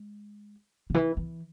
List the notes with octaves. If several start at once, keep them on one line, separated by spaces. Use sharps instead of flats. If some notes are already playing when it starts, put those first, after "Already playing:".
Already playing: G#3
C#3
E3
E3